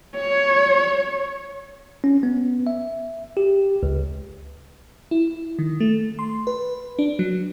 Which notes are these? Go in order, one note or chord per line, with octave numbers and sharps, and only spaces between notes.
C#5
C#4
B3
E5
G4
C#2
E4
D#3
A3
C6
B4
D4
F#3